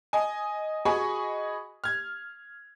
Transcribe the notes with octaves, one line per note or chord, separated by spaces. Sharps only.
D#5 G#5
F#4 G#4 D#5 G#5 B5 C#6
F6 G#6